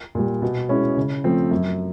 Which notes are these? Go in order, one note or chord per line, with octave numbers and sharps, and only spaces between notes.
A#2 G3
B2
G#3 C#4 E4
C#3
F3 A3 C4
F#2